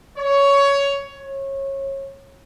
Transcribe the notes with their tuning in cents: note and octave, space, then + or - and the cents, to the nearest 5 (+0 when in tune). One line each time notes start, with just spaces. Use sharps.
C#5 +15
C#5 -25